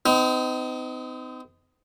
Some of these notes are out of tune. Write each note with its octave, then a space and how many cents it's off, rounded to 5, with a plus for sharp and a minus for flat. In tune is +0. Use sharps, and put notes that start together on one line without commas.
C4 -45 D#4 +5